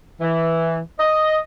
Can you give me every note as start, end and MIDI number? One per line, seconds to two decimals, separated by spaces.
0.21 0.78 52
1.00 1.38 75